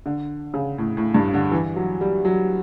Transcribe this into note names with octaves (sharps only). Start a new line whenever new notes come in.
D3
C#3
A2
A2
G2
D3
E3
F#3
G3
F#3